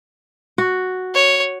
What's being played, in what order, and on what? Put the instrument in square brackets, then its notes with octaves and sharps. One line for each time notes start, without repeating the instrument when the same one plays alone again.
[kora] F#4
[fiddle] C#5